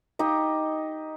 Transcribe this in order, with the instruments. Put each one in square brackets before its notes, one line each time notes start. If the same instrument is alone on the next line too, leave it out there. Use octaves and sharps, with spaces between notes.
[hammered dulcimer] D#4 G4 D#5